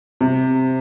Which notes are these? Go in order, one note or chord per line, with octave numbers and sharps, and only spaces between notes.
C3